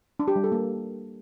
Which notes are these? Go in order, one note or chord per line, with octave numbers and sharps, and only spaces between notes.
D4
G4
G3
A4
A#3